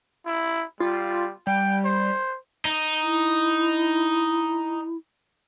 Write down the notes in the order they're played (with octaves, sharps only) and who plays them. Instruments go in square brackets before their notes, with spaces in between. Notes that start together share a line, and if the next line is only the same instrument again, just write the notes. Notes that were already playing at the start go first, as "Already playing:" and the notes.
[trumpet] E4
[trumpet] G3 [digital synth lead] F4
[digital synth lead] G3 [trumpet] G5
[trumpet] C5
[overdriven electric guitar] D#4
[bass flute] E4